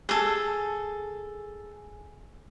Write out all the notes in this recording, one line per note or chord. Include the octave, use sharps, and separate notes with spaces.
G#4 A4